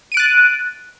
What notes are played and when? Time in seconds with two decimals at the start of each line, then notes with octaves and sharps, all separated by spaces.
0.12 D#7
0.14 D7
0.17 F#6
0.20 A6